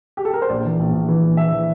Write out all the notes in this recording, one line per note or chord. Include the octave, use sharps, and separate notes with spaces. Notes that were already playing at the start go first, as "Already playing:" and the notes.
G4
A4
A#4
C5
A#1 D5
E3
A#1
A#1
E3
A#1
E3 E5
E3